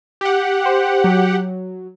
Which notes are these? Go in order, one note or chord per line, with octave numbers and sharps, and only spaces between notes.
G4 F#5
C5
F#3